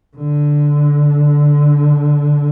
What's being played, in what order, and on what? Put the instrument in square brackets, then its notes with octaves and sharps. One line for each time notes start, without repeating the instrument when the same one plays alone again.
[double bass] D3